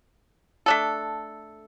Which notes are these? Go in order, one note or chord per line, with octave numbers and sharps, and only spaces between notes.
A3 D4 A4